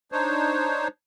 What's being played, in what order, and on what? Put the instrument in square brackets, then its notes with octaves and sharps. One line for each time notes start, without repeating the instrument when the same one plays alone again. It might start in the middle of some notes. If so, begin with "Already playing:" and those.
[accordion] D4 D#4 C5 C#5